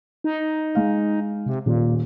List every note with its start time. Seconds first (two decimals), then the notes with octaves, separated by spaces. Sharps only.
0.24 D#4
0.75 G#3 F5
1.46 C3
1.66 D#1 A#2